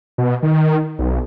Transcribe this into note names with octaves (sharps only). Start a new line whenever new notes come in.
B2
D#3
B1